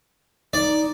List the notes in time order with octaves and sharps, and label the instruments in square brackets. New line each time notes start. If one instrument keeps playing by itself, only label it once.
[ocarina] D#4 [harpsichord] D5